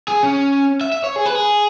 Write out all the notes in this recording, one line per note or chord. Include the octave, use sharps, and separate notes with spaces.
G#4
C#4
E5
E5
C#5
G#4
B4
G#4